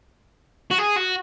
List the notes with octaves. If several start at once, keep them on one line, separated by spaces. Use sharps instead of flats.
F#4
G#4
F#4